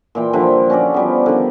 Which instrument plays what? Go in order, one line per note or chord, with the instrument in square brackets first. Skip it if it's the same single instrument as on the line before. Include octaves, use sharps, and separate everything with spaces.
[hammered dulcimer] A#2 E3 G5
D3 F3 G3 E4
C#4 F#4 A4 D5
F3 G3 B3
D3 D#3